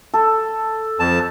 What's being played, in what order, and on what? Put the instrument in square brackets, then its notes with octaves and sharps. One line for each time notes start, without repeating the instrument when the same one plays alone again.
[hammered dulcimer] A4
[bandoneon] F2 A5